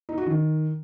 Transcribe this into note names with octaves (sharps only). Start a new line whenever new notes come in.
D#4
F#4
D#3